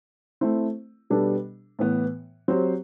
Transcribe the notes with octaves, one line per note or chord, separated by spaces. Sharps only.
A3 C4 E4
B2 G3 B3 D4 A4
A2 E3 B3
F#3 C4 G4 C5